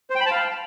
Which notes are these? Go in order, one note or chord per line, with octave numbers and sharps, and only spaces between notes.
C5
G5
B5
A5
F5